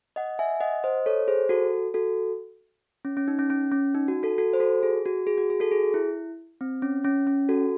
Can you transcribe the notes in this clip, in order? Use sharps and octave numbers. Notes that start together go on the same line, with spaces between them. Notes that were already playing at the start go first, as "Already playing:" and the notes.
D#5 F#5
E5 G#5
D#5 F#5
C5 D#5
A4 C#5
G#4 C5
F#4 A4
F#4 A4
C#4
C#4
D#4
C#4
C#4
C#4
D#4
F#4
F#4 A4
F#4 A4
C5
F#4 A4
G#4
F#4
G#4
F#4
G#4
F#4 A4
G#4
E4
C4
C#4
C#4
C#4
F#4 A4